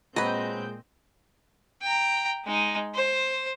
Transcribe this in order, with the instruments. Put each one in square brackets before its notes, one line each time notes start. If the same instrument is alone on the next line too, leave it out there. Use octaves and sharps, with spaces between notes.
[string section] A#2 C4 G6 [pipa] F#3 B4 [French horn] G#3 [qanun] D#5
[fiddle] G5 A#5
G#3 D#4
C5